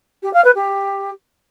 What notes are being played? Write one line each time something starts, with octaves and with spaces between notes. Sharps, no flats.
G4
F5
B4
G4